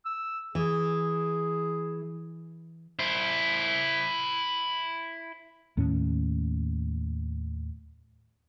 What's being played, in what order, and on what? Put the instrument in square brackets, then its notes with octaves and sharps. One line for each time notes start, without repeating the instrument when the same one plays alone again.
[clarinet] E6
[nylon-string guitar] E3 [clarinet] G#4
[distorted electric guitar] E4 C5
[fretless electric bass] D#2 A2 C#4